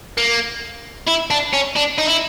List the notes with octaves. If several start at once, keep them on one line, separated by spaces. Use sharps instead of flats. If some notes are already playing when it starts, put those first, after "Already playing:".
A#3
E4
D4
C#4
D4
D#4
E4